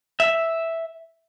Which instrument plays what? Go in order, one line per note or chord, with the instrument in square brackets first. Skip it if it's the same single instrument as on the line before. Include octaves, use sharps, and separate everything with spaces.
[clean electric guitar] E5